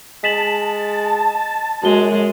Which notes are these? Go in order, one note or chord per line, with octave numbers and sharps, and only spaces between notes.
G#3 A5 B6 E7 F#7
F#2 G#3 F#4 G7